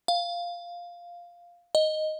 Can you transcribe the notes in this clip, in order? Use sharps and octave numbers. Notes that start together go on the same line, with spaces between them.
F5
D#5